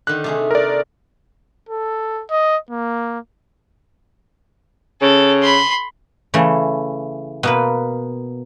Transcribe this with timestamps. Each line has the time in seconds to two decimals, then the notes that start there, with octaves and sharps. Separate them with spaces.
0.07 D3 D#3 F#6
0.24 C3 A3 G#4
0.51 A#4 D5
1.69 A4
2.31 D#5
2.71 A#3
5.02 C#3 A4
5.42 B5 C6
6.34 C#3 E3 A3
7.43 B2 A#3 B4